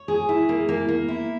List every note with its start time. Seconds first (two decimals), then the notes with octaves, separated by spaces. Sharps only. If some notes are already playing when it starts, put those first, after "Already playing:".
Already playing: C#5
0.08 G#4
0.29 E4
0.49 A#3
0.69 A#3
0.88 A#3
1.08 E4